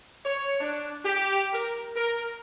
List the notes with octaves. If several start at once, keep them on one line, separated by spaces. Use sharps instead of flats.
C#5
D4
G4
A#4
A#4